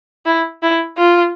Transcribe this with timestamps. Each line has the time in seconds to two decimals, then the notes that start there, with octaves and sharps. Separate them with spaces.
0.26 E4
0.63 E4
0.98 F4